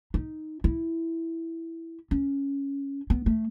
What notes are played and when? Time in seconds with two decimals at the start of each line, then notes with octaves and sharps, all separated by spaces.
0.14 D#4
0.64 E4
2.11 C#4
3.10 B3
3.26 A3